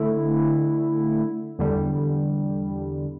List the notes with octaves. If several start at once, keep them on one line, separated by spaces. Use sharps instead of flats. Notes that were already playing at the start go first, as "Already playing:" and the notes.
Already playing: D3 A3 E4
E2 D3 G3